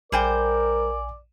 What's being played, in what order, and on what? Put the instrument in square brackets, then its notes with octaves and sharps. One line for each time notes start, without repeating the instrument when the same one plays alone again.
[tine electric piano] A#1 G#5 [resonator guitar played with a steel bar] G3 C5 G5 [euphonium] A#4 [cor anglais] D5